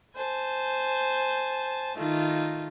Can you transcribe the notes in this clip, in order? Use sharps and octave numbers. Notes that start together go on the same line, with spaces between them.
C5 G#5 A5
D#3 A3 D#4 F4